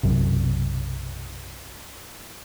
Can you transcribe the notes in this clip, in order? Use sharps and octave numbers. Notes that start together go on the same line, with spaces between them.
B1 F#2 C3